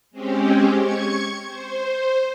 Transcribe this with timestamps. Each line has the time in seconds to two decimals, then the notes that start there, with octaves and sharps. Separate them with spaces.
0.11 G#3 C4 C#4 G4
0.78 C#6 G#6 C#7
1.46 C5